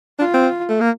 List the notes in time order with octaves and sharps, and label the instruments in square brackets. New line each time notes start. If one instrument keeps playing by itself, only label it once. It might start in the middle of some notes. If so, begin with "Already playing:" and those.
[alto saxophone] D4 [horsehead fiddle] F4
[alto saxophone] C4
A3
A#3